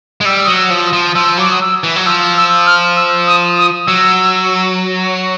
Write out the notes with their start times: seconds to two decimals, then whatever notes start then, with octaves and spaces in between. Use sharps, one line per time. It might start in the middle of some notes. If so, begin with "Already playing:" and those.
0.21 G#3
0.25 G3 E6
0.45 F#3 D#6
0.55 E6
0.70 F3
0.85 D#6
0.93 F3
1.15 F3 E6
1.38 F#3 D6
1.51 D#6
1.61 E6
1.84 E3
1.96 F#3
2.06 F3 E6
2.37 E6
2.67 F6
2.96 E6
3.27 D#6
3.58 D#6
3.87 F#3 E6